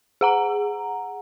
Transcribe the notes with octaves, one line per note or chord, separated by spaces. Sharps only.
G#4 F#5 A#5